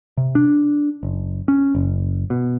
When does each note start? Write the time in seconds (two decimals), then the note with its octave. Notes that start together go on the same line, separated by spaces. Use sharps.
0.17 C3
0.35 D4
1.03 F#1
1.48 C#4
1.75 F#1
2.30 B2